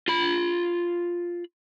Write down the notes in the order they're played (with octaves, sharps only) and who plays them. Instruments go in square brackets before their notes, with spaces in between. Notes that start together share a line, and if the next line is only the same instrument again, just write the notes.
[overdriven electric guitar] F4 B5